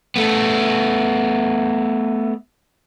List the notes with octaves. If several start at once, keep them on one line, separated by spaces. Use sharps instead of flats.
A3 B3